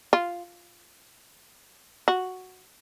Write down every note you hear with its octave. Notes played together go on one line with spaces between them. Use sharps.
F4
F#4